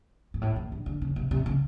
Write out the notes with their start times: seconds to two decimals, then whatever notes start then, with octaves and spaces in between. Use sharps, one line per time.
0.34 G#2
0.42 A2
0.56 A#2
0.72 D3
0.86 D3
1.02 C#3
1.16 C3
1.31 C3
1.46 C#3